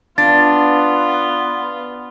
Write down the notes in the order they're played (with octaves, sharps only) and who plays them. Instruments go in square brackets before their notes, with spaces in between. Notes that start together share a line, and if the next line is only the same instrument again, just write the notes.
[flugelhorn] B3 [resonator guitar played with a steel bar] D4 [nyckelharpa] F4 [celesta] A6